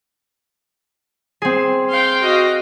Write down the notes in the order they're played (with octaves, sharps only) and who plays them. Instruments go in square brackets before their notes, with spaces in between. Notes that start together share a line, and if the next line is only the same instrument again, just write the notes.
[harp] C4 G#4
[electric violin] F5 G5 [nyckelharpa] C6
[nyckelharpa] F#4 D#5